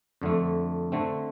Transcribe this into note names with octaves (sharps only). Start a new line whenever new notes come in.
F2 D3 A3
D3 A3 C4